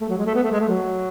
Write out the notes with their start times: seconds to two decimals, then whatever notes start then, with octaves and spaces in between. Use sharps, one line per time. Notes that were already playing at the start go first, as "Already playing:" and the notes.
0.01 A3
0.10 F#3
0.18 G#3
0.26 A3
0.35 B3
0.43 A3
0.52 G#3
0.60 A3
0.69 F#3